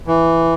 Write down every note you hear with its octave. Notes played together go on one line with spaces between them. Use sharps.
E3